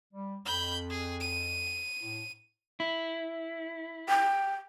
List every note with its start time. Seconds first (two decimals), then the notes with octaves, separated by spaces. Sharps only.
0.13 G3
0.45 F2 B5 G6
0.90 G#4
1.20 D#7
2.00 A2
2.80 E4
4.09 G5